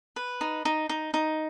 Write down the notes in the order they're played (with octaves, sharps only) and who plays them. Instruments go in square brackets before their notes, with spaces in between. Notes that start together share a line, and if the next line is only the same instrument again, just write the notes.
[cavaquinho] B4
D#4
D#4
D#4
D#4